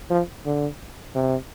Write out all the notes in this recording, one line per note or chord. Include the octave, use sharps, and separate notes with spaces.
F3
D3
C3